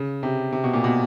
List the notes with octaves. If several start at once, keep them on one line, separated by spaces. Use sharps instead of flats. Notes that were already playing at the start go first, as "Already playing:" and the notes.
Already playing: C#3
C3
C3
B2
A#2
B2